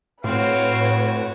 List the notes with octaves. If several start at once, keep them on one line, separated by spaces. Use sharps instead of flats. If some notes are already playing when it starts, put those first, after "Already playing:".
A2 C4 F#4 B4 C#5 F5